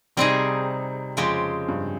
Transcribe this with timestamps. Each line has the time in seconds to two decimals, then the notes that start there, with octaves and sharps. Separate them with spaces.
0.17 C3 G3 C4 D#4 G#4
1.17 F2 C#3 G#3 C4 G4
1.68 G2